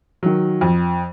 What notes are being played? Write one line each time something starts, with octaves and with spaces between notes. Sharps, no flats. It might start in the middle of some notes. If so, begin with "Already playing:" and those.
D#3 F#3
F2